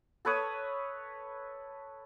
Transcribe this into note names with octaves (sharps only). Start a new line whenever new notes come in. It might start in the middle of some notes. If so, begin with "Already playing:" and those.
A4 B4 C#5 D#6